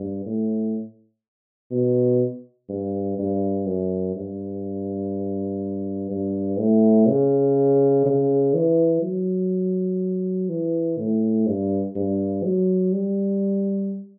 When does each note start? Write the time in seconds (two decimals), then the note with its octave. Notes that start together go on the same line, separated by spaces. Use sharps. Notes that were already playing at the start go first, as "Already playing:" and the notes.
Already playing: G2
0.26 A2
1.71 B2
2.69 G2
3.19 G2
3.66 F#2
4.16 G2
6.11 G2
6.59 A2
7.08 C#3
8.06 C#3
8.54 E3
9.03 F#3
10.49 E3
10.99 A2
11.47 G2
11.96 G2
12.44 F#3
12.93 G3